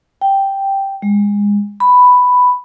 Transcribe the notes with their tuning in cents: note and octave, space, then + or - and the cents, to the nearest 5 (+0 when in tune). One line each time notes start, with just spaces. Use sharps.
G5 +0
G#3 -25
B5 +5